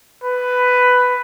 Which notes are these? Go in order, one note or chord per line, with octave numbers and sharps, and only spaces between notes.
B4